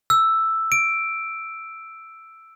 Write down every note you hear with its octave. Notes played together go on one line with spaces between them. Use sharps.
E6
D7